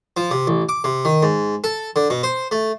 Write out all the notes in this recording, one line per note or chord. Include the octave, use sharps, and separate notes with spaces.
F3
C3
A1
D6
C3
D#3
G#2
A4
D3
B2
C5
A3